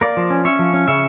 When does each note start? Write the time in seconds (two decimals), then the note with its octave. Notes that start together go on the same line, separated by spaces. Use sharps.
0.01 A#3 A#4 D5
0.17 F3
0.30 C#4
0.45 C#4 C#5 E5
0.59 F3
0.74 C#4
0.88 C#3 C#5 E5